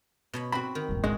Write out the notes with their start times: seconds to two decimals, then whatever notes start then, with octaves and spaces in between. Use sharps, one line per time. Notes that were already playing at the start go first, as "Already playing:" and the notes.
0.33 B2 C#5 B5
0.52 C4 F#4 B5
0.75 D#3
0.89 D#1 G#1
1.04 G#3 F#4